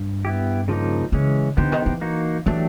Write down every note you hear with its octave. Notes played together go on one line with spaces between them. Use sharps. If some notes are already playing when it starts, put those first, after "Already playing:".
Already playing: G2
B3 E4 G4
C#3 F3 A#3 D#4
C#3 E3 G#3 C#4
D3 B3 D#4 G4 C5
D#3
E3
A#3 D#4 F#4
E3 F#3 A3 D4 G4